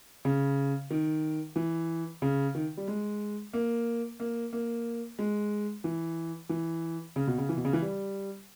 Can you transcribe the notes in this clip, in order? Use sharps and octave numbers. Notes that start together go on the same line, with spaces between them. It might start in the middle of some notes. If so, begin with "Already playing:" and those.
C#3
D#3
E3
C#3
D#3
G3
G#3
A#3
A#3
A#3
G#3
E3
E3
C#3
B2
C#3
E3
B2
C#3
E3
G3